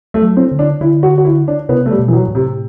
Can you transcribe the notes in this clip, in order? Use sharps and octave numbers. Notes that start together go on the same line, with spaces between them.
A3
F#3
C4
D3
D4
D3 E4
F#4
F#4
E4
D4
C3 B3
A3
G3
B2
E3
F#3
A2
C3